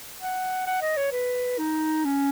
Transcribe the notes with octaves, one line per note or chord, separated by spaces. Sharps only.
F#5
F#5
D#5
C#5
B4
D#4
C#4